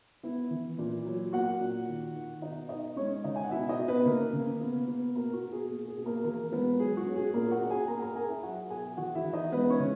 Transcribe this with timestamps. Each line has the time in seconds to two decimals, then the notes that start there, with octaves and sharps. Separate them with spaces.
0.23 B3 E4 E5
0.51 E3
0.78 A#2
1.06 F#3
1.33 A#3 F#4 F#5
1.61 A#2
1.88 D#3
2.15 D#3
2.42 B2 D#4 D#5
2.69 B2 D#4 D#5
2.96 G#3 C#4 C#5
3.24 C#3 D#4 D#5
3.36 G#5
3.44 F#5
3.51 B2 E4 E5
3.69 D#4 D#5
3.78 B2
3.88 B3 B4
4.06 C#3 A#3 A#4
4.33 C#3
4.61 B3
4.88 B3
5.15 B2 A#3 A#4
5.33 F#4
5.43 B2
5.52 G#4
5.70 A#3 G#4
5.88 G#4
5.97 B2
6.06 A#3 A#4
6.24 E3 A#3 A#4
6.52 G#3 B3 B4
6.79 F#3 G#4
6.97 F#4
7.06 C#4
7.16 G#4
7.34 A#2 A#3 A#4
7.51 F#4 F#5
7.61 C#4
7.70 G#4 G#5
7.88 A#3 A#4 A#5
7.98 G#5
8.02 A#4 A#5
8.15 C#4 G#4 G#5
8.29 E4 E5
8.43 F#3 F#4 F#5
8.70 B2 G#4 G#5
8.97 E3 F#4 F#5
9.15 E4 E5
9.25 E3
9.33 D#4 D#5
9.52 G#3 B3 B4
9.70 C#4 C#5
9.80 C#3